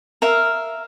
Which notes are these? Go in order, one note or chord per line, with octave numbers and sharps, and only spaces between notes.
A#4 E5 F5